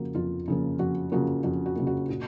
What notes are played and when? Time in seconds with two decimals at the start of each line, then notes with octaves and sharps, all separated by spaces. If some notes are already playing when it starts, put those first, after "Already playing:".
Already playing: F2 C#3 F3 A#3 F#4
0.15 F2 F4
0.48 C#3 F3 A#3
0.79 F2 F#4
1.12 C#3 F3 A#3 F#4
1.44 F2 F#4
1.66 F#4
1.76 C#3 F3 A#3
1.87 F#4
2.09 A#2 F#4